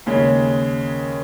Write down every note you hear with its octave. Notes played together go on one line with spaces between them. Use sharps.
D#2 C#3 G#3 C#4